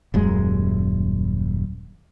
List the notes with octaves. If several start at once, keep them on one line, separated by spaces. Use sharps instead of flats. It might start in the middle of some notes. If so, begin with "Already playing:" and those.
D#1 F#2 G#3